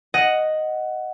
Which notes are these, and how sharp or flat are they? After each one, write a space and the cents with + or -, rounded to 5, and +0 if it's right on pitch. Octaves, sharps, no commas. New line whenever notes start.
D#5 +0 F#5 +5